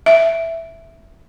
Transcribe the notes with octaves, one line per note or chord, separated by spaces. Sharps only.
E5